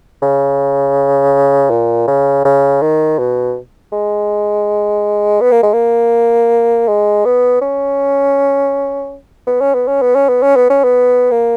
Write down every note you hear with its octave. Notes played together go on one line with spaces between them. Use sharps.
C#3
A#2
C#3
C#3
D#3
B2
G#3
B3
A#3
G#3
A#3
G#3
B3
C#4
B3
C#4
B3
C#4
B3
C#4
B3
C#4
B3
C#4
B3
A#3